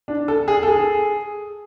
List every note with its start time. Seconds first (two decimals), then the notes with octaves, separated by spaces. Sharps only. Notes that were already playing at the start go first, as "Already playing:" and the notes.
0.08 D4
0.28 A4
0.48 G#4
0.63 A4
0.68 G#4